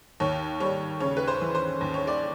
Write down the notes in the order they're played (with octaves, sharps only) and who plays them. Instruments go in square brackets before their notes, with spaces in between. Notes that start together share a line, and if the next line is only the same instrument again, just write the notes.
[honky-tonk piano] D#2 C#5
G3 C#5
C#3 C#5
B4
C5
E3
C5
D#2
C#5
D5